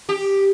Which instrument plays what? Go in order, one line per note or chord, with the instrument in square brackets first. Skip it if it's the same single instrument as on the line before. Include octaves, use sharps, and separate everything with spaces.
[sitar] G4